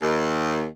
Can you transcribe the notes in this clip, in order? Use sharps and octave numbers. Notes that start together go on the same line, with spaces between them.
D#2